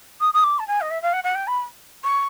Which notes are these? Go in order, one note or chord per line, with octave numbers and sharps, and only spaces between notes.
D#6
D#6
D6
A5
G#5
D#5
E5
F5
F#5
F#5
G5
B5
C#6